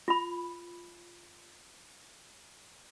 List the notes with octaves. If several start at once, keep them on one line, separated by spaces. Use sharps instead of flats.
F4 B5